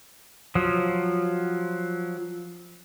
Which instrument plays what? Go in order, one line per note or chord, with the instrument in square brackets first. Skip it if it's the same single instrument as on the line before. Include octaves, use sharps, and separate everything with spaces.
[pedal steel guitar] F3 F#3